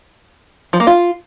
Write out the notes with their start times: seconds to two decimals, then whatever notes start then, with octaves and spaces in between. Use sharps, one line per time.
0.73 F3
0.80 A#3
0.87 F4